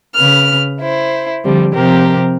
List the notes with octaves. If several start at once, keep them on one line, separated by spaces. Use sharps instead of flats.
C#3 B4 F6
E4 C5
D3 F3 G3 C4
C3 F3 G4 A#4 C5